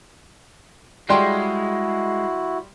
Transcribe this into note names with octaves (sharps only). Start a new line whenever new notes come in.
G3 G#3 E4 F#4 G5 C6